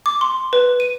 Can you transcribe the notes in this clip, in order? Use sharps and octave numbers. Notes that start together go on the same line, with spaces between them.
D6
C6
B4
D#7